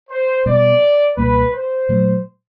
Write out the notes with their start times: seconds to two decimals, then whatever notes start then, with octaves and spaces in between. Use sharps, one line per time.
0.10 C5
0.46 B2 G3 B3 D5
1.17 C#2 B2 G3 A#3 B4
1.54 C5
1.89 A#2 F#3 A3